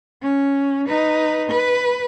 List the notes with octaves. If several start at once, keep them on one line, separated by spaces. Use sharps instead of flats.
C#4
D#4 B4
B4